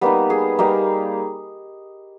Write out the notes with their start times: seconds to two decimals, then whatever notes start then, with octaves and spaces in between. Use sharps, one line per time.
0.01 G3 A#3 B3 D#4 B4
0.30 G#4
0.59 G3 A#3 D#4